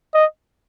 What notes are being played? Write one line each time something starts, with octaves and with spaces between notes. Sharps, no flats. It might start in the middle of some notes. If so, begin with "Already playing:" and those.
D#5